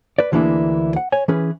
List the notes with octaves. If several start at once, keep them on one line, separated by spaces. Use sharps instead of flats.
B4 D5
D2 E3 A#3 D4 E4 G#4
F#5
C#5 G#5
E3 C#4 G#4 B4